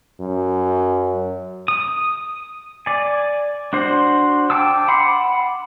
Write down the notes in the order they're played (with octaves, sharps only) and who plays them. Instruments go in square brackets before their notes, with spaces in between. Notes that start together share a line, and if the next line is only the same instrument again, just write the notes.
[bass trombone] F#2
[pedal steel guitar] D#6
D5 G#5
D4 F#4 C5
G5 A5 D6 E6
F#5 B5 C6 D6